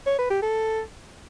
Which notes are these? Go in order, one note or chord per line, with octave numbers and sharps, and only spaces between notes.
C#5
B4
G4
A4